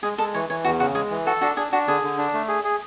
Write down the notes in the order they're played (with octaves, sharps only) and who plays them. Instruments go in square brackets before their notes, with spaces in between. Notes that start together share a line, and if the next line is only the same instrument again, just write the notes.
[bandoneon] G#3 [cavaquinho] G#4
[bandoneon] G#3 [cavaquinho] A4
[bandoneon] E3 [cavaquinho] C#5
[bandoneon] E3 [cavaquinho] C#5
[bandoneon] E2 [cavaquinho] F#4
[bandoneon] C#3 [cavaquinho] F#4
[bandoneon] G#3 [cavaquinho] G#4
[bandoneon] E3
[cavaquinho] F#4 [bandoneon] A4
[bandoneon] D4 [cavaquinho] F#4
[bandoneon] D4 [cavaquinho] G#4
[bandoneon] D4 [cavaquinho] F#4
[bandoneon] D3 [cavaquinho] G#4
[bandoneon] D3
D4
A3
G#4
G#4